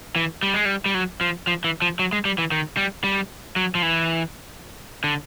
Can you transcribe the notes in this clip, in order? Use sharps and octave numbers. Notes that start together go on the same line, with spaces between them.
E3
G3
G#3
G3
G3
F#3
F3
F3
E3
F3
F#3
G#3
G3
E3
D#3
G3
G3
F#3
F3
E3
D3